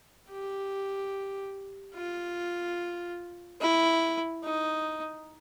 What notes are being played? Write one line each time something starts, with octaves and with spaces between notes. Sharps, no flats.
G4
F4
E4
D#4